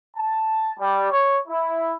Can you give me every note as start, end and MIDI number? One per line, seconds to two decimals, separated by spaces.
0.16 0.73 81
0.79 1.09 55
1.11 1.38 73
1.48 1.93 64